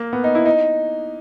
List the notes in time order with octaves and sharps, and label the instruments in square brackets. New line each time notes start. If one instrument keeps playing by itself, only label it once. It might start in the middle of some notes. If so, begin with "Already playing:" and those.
Already playing: [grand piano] A#3
B3
D#4
E4
D#4